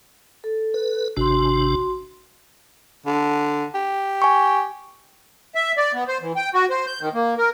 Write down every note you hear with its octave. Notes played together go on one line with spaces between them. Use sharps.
A4
B4
G#1 C3 D4 F#4 C6
D3
G4
G#5 C#6
E5
D5
B3
C5
E3
G5
F#4
C5
G6
D#3
A#3
A#4